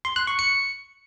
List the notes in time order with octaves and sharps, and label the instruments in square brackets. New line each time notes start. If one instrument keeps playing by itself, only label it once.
[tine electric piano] C6
F#6
C#6
C#7